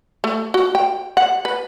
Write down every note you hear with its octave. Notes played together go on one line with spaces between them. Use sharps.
A3
F#4
G5
F#5
B4